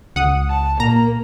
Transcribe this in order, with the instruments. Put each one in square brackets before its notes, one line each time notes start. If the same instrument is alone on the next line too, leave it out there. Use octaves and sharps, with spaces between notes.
[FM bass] C#2 [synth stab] F#5 D#6
[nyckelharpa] A5
[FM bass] A#2 [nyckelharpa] A#3 [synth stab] A#5